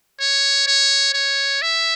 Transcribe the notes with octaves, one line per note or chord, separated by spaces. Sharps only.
C#5
C#5
C#5
E5